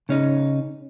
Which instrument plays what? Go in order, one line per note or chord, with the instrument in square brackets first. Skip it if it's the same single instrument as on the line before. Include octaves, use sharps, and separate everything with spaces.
[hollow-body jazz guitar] C#3 C#4 D#4